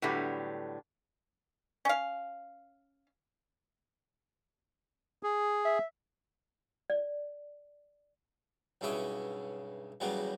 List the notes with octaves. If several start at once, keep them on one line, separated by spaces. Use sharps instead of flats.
A2 D3 F#3 G3 B3
C#4 F5
G#4
E5
D5
B1 G2 C#3 E4 C#5 D#5
E2 C#3 F#3 G3 A#3 B3